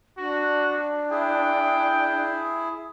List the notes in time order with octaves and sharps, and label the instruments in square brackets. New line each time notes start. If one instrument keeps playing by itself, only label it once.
[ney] D4 [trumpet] F#4
[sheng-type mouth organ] E4 G#4 [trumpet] G5